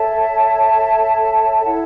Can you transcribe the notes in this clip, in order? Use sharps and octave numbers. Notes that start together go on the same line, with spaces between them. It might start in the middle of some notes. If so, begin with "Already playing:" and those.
Already playing: A4 C#5 E5 A5
E4 A4 C#5 F#5